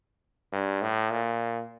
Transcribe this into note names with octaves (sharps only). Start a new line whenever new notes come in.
G2
A2
A#2